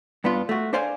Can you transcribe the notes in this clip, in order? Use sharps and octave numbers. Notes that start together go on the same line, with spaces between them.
G2 B3 D4 F4
A3 F#4
D4 A4 C5 D5 F5 G#5